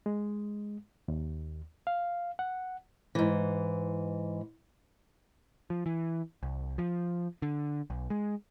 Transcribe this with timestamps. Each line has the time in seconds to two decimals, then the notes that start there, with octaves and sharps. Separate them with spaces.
0.06 G#3
1.08 D#2
1.87 F5
2.39 F#5
3.15 G#2 E3
5.70 F3
5.86 E3
6.43 C2
6.78 F3
7.42 D3
7.90 B1
8.10 G#3